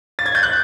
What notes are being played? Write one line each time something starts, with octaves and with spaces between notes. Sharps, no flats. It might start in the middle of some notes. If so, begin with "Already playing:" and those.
A6
G#6
G6
F#6